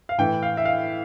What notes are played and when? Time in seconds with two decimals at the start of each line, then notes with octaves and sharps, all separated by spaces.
0.09 F5
0.18 A2 E3 G5
0.43 F5
0.57 E5
0.65 F5